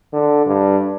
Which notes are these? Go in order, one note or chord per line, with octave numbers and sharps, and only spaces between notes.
D3
G2